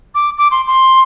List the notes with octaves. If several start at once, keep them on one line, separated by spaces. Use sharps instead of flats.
D6
D6
C6
C6